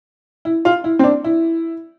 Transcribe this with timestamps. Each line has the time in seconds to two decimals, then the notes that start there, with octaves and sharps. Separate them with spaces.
0.45 E4
0.65 F4
0.84 E4
0.99 C4
1.04 D4
1.24 E4